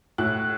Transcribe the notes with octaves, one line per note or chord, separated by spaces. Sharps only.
A2 F#6